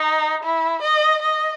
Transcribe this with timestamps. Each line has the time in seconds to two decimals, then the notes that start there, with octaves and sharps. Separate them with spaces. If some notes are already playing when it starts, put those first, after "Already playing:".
Already playing: D#4
0.43 E4
0.82 D#5
1.22 D#5